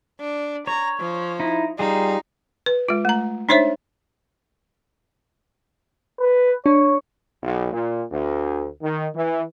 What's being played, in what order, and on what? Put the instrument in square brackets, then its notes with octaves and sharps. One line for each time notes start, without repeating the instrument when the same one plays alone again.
[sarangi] D4
[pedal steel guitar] C#5 [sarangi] A#5
[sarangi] F3
[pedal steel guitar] D#4 E4
[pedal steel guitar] G3 F4 G#4 [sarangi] D#4
[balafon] B4
G#3 F4
A3 A#5
D4 D#4 C5 C#5 E5
[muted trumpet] B4
[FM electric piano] D4 [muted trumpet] C#5
[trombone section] B1
A#2
D2
D#3
E3